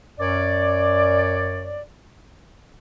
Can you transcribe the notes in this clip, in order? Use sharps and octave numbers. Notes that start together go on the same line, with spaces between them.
F#2 C#5 D5